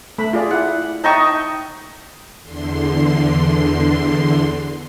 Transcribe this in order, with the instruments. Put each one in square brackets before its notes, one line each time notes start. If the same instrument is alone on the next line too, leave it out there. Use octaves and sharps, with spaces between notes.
[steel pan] A3 B5
F4 G#4 D5
[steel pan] E4 [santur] F#5
[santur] D#4 D#5 C#6 [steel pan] E5 G5 A5
[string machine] E2 D3 C6